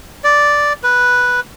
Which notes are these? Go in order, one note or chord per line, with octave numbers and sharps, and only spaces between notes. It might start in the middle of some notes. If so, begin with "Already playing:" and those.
D5
B4